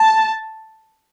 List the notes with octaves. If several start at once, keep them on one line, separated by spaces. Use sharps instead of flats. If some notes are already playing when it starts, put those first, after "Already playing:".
Already playing: A5